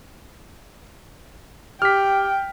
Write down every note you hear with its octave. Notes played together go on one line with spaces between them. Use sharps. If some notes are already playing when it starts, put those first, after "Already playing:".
G4 G5 D6 F6 B6